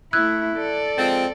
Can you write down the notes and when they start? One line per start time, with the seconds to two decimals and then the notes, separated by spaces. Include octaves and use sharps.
0.13 A3 E4 E6 F#6 G#6
0.57 A4 D5
0.98 F3 G#3 C4 A6